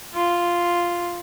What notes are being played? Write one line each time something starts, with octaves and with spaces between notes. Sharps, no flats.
F4